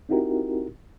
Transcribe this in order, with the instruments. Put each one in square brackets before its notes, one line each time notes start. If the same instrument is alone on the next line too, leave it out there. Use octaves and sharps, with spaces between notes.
[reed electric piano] C4 D#4 E4 F#4 G4 A#4